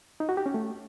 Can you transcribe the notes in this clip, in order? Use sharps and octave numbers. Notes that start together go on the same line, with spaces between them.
D#4
F#4
G4
C#4
A3